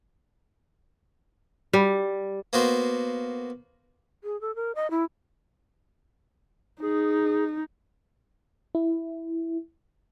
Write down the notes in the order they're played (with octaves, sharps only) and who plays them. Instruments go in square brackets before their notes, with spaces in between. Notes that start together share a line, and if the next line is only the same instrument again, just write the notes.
[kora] G3
[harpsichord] A#3 B3 F#4 C5
[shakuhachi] G#4
A4
A#4
D#5
E4
[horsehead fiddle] D#4 [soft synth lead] G#4
[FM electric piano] E4